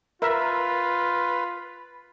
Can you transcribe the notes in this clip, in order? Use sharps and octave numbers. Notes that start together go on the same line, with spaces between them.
F4 A#4 B4 E5